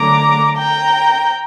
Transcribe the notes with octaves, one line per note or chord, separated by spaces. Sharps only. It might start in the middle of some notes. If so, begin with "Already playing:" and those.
Already playing: D3 F#3 A3 A#5 D6
G5 A#5